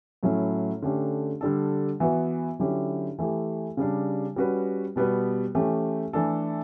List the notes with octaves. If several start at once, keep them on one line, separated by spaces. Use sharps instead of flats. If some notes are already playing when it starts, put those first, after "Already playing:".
A2 F#3 A3 C#4 E4
D3 A3 C#4 G4
D3 G3 D4 A4
E3 B3 F#4 B4
D3 F#3 C#4 E4 G4
E3 A3 E4 G4
C#3 G3 D4
G3 C#4 F#4 B4
B2 G3 B3 F#4 B4
E3 A3 C#4 G4
E3 A3 D4 A4